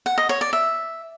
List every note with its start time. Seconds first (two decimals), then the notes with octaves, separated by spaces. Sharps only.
0.06 F#5
0.18 D#5
0.29 C#5
0.41 D5
0.53 E5